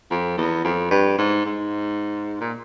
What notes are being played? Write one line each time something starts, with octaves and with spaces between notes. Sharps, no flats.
F2
E2
F2
G2
G#2
G#2
A#2